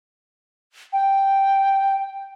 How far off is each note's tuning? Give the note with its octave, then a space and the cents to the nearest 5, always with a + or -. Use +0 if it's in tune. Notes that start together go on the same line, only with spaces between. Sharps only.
G5 -5